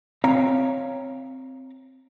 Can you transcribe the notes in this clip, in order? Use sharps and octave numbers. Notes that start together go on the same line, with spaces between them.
C4 C#5 F5 G5 A#5